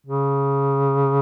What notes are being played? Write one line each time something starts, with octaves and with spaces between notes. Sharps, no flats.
C#3